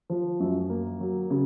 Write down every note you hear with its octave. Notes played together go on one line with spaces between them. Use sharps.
F3
F#2
A#3
F#3
C#3